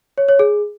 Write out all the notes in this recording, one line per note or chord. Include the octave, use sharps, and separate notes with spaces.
C#5
C#5
G#4